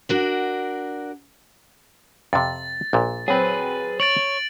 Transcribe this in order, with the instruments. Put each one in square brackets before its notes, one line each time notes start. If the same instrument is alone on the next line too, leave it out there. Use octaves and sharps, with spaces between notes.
[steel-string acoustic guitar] D4 F#4 A#4
[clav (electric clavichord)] F2 C3 [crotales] A6
[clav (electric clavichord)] A#1 A#2
[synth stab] F#3 C4 [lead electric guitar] G#4 B4
[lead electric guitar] C#5 [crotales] A6 D7 F#7